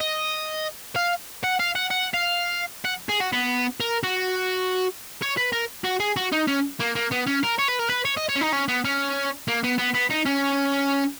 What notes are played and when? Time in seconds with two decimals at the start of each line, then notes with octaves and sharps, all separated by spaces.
0.01 D#5
0.96 F5
1.44 F#5
1.59 F5
1.75 F#5
1.90 F#5
2.14 F5
2.85 F#5
3.09 G#4
3.21 F#4
3.33 B3
3.80 A#4
4.03 F#4
5.22 C#5
5.37 B4
5.53 A#4
5.85 F#4
6.00 G#4
6.16 F#4
6.32 D#4
6.47 C#4
6.80 A#3
6.95 A#3
7.11 B3
7.26 C#4
7.43 A#4
7.58 C#5
7.68 B4
7.79 A#4
7.90 B4
8.05 C#5
8.17 D#5
8.29 C#5
8.36 C#4
8.41 D#4
8.53 C#4
8.68 B3
8.85 C#4
9.48 A#3
9.64 B3
9.79 B3
9.95 B3
10.11 D#4
10.26 C#4